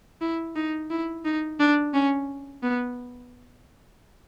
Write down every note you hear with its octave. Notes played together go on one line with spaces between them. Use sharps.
E4
D#4
E4
D#4
D4
C#4
B3